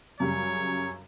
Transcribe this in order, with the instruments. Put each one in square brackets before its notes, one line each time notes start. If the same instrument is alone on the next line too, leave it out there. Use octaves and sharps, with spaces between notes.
[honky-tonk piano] F#2 C#3 G3 [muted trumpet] C#5